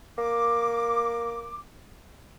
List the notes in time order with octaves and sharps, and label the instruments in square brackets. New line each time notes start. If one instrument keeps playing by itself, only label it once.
[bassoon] A#3 [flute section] D6